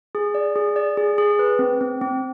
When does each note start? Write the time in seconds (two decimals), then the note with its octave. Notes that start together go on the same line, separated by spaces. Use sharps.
0.15 G#4
0.35 D5
0.56 G#4
0.76 D5
0.97 G#4
1.18 G#4
1.39 B4
1.59 C4
1.81 C4
2.01 C4